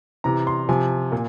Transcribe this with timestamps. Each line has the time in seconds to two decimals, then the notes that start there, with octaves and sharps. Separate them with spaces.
0.24 C3 E3 A#5
0.47 C6
0.69 C3 F3 G#5
1.12 A#2